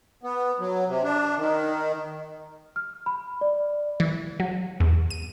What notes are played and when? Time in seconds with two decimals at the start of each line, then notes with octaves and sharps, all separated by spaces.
0.23 B3
0.59 F#3
0.87 C3
1.03 D4
1.38 D#3
2.76 F6
3.06 B5
3.41 D5
4.00 E3
4.40 F#3
4.80 E2
5.10 D#7